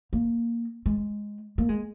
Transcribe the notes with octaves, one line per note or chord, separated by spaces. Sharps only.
A#3
G#3
A#3
G#3